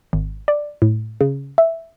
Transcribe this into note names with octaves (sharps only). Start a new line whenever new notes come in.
G#1
D5
A2
C#3
E5